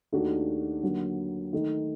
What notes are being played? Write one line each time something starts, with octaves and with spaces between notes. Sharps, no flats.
D#2 D#3 A3 D4 F#4
D3 F#3 A#3
D#3 A3 D#4